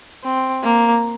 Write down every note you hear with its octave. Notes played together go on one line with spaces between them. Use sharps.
C4
A#3